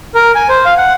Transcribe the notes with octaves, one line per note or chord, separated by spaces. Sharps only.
A#4
G#5
C5
F5
F#5